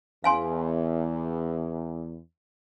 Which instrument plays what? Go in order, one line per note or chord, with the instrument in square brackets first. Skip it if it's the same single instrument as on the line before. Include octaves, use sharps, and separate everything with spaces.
[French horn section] E2 [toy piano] F5 G#5 C6